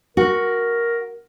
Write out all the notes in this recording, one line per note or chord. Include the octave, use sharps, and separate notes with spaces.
F#4 A#4